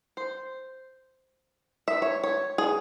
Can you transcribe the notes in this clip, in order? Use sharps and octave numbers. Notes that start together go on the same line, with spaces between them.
C5
E5
C#5
C#5
G#4